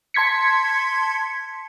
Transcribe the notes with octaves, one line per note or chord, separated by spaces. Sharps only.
A5 C6 G#6 B6 C#7